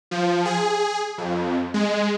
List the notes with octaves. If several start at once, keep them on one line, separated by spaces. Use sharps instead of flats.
F3
G#4
F2
G#3